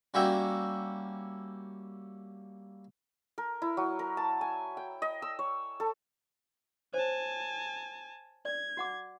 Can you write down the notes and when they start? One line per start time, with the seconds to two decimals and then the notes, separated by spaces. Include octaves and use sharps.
0.14 G3 A#3 C#4 F#4 E5 G5
3.38 A#4
3.62 E4
3.77 F#3
3.99 A#4
4.17 A5
4.41 G#5
4.77 G5
5.02 D#5
5.22 E6
5.39 C#5
5.80 A4
6.94 C5 C#5 G#5 A5
8.45 D5 G#6
8.77 F#4 F#5 D6